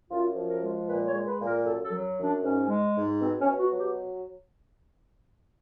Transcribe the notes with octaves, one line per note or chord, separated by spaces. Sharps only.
F#2 F4
F3
A#4
G#3
A#2 B4
C#5
G#3
B4
A#2
A#4
F#2 A4
A4
F#3
F#2
D4
G#2 C#4
G#3
G#2
B2 C4
C#4
B2
F#4
F#3
G4